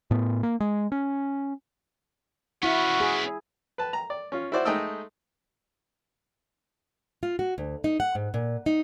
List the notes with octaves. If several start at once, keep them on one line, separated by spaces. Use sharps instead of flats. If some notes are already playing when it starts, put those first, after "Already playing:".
A2 B3
A#3
G#3
C#4
B3 C#4 E4 F#4
G#4
B4 A5
A#5
D5
C#4 F4
E4 F#4 C5 D5
G#3 A3 D#4 D#5 G5 E6
F4
F#4
D2
D#4
F#5
G#2
A#2
D#4